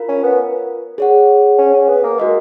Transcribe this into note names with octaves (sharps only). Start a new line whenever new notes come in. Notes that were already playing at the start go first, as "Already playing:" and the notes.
Already playing: F4 A#4 F5
C#4
B3
G#4 C#5 F#5
C#4
C#4
B3
A#3
G#3 F#4 A#4 D#5